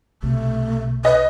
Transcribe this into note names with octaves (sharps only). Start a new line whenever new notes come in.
B1 C3 A3
B4 D#5